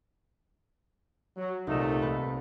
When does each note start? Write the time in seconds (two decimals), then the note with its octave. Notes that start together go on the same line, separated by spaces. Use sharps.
1.37 F#3
1.67 C2 A#2 A3 D#4 E7
2.02 C2 B4